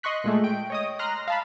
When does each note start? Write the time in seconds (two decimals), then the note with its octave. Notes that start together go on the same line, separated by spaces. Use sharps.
0.03 D#5 C6 C#6 F#6 B6
0.24 A#2 G#3 A3
0.44 G5 D7
0.70 C#5 D#5 D#6
0.99 A#5 C6 F6 F#6 A#6
1.28 F5 A5 B5